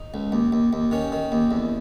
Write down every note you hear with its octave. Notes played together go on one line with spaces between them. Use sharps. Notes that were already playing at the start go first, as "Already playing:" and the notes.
Already playing: D#4
C#2
D#2
D#2
D#2
D#3 C#4
D#3
D#2
E2